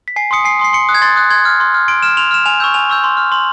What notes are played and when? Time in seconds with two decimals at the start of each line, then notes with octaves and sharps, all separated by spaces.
0.08 B6
0.16 G#5 C7
0.31 C6 D#6 C#7
0.44 G#5 C7
0.59 C6 D#6
0.64 C7
0.73 C6 C#7
0.89 D#6 F#6
0.95 G#6
1.02 C6 A6
1.16 D#6 F#6
1.30 C6 G#6
1.45 F6
1.60 C6
1.74 F6
1.88 C6 D7
2.03 F6 E7
2.17 C6 F7
2.31 F6 E7
2.46 G#5 F7
2.60 C#6 E6 G6
2.74 G#5 F7
2.89 C#6 E6 G6
3.04 C6
3.17 F6
3.32 C6 F#7